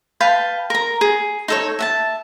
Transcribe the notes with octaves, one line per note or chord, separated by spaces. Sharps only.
B4 F5 G5 A5
A#4 A#5
G#4
D#4 A4 C#5
E5 F#5 A5